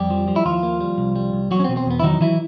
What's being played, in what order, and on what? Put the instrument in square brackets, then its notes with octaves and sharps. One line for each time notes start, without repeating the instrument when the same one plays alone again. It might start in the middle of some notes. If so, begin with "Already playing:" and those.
Already playing: [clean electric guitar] F2 G3 G4
F3
F3
E4
D#2 F3 F4
A#3
G3
C2
G3
C2
E2 F#3 F#4
C#4
C4
B2
C4
E2 B3
E4
D#3 F#3 D#4
E3 F#3 E4